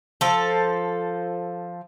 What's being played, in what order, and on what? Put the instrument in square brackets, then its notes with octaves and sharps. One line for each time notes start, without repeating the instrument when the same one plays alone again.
[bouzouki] F3 A4